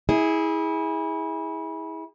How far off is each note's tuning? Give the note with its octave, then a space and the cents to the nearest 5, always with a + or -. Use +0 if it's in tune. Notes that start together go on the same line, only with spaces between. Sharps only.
E4 -30 G#4 -10